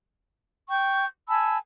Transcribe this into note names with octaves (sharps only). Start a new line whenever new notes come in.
G5 C#6 G6
G#5 A5 B5 E6